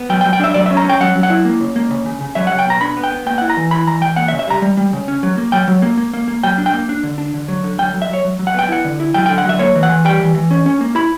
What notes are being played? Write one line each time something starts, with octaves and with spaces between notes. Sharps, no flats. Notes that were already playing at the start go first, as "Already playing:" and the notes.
Already playing: B3
F#3 G5
G5
F#3
G5
D4 E5
F#3 D5
C#4 E5
A#5
C#4 G5
F#3 F#5
F#3
F#5
E4
A#3
C#3
A#3
C#3
C#3
C#3
F#3 E5
F#3 F#5
G5
B2 A#5
D4 B5
B3
G5
B3
A#3 G5
E4 F#5
A#5
E3
E4 B5
E3 A#5
E3 G5
A#3 F#5
E5
C#3
E5
G3 A#5
G3
G3
C#3
C#4
F#3
A#3
F#3 G5
F#3
A#3
A#3
A#3
A#3
F#3 G5
D4
G5
A#3
D4
D3
D4
D3
F#3
D3
F#3 G5
F#3
E5
F#3 C#5
F#3
F#3
F#5
B3 G5
E4 F#5
D3
E4
F#3 G5
D3 G5
F#5
F#3 E5
A#3 C#5
E3
F#5
E3
G3 G5
E3
E3
C#4
C#4
A#3
E4 B5